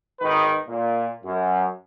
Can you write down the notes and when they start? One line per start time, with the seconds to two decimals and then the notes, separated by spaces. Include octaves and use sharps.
0.21 G#1 D#3 D#4 B4
0.67 A#2
1.22 F#2